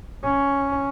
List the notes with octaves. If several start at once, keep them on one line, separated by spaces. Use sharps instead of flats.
C#4